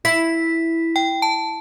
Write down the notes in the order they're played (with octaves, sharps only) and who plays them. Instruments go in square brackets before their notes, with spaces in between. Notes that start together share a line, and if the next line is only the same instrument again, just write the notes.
[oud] E4 [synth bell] B6
[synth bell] G5
A5